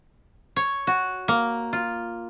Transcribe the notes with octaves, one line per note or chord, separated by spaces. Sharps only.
C#5
F#4
A#3
F4